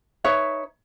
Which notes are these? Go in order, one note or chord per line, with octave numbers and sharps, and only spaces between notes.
D#4 B4 C#5 E5